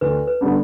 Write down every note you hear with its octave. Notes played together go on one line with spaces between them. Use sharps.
D2 B4
B4
D3 G3 B3 D4